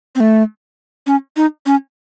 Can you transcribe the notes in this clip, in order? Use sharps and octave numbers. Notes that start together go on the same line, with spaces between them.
C4
A3
C#4
D#4
C#4